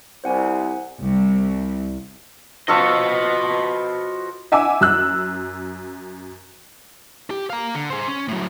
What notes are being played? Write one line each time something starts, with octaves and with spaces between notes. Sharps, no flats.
C2 C5 F#5 G#5
C2
F3 F#4 A4 B4 D#5 C#6
E5 F#5 G#5 D6 E6
F#2 E6 F#6
G4
F5 A#5
D3
G#4 C5
C#4
A2 F#3